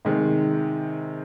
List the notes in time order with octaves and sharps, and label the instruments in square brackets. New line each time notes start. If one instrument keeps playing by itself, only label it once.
[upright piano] C3 D#3 G#3